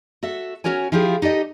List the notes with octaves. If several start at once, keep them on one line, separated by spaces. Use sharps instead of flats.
F#4 A4 E5
C#4 F#4 A#4 C#5 G#5
F3 E4 F4 G4 G#4
D#4 G4 A4 D#5